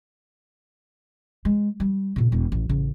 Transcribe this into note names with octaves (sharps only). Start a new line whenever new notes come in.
G#3
G3
A#2 C#3
E1 E4
A1
A1 C#3